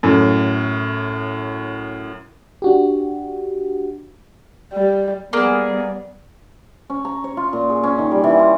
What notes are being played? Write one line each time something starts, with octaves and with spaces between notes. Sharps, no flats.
F#2 A2
D4 F#4 G4
G3
G3 A#3 B3 G#4 D5
C#4
A#5
C#5
F4
A#2
G#4
C#4
D#3
G3
E3
F4